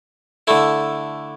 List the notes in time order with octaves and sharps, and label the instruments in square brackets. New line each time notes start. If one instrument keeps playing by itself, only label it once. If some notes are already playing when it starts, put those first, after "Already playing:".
[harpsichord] D3 A3 E4